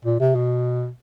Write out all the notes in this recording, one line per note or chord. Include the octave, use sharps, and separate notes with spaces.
A#2
C3
B2